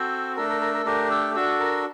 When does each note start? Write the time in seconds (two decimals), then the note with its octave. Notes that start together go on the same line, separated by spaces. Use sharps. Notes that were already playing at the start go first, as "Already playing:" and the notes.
Already playing: C4 F#4 A4 C5
0.36 A3 D4 A4 A#4
0.49 A#4
0.61 A#4
0.74 A#4
0.85 A3 D4 G4 A#4
1.10 A4
1.35 D4 F#4 A4
1.60 A#4